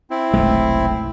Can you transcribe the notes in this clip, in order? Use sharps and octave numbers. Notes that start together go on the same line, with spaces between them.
C4 E4
F1 B1 G#3 A3